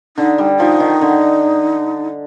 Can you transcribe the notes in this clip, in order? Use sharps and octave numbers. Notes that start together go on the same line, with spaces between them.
D3 D#4
G3
F3 D#4
D#3
D3